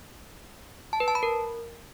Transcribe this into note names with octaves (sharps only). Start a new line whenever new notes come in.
A5
B4
A5
B5
A#4